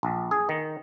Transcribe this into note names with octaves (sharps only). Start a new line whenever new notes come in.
A#1
G#4
D#3